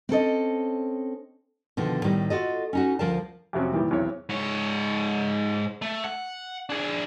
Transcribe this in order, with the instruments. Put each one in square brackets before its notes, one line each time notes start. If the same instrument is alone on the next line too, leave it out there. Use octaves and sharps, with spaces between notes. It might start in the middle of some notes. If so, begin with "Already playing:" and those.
[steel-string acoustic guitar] C4 C#4 A4 D#5
[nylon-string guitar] B2 D3 D#3 F3
A2 D#3 G3 D#4
F4 F#4 A4 D#5
C#4 D#4 F#4
D2 F3 A#4 F5 A5
[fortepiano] F2 C3 F#3 C4 C#4
A#2 D#3 E3 G3
B1 E2 E3 C4 C#5
[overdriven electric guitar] G#2 C#5
A3
F#5
D4 G#4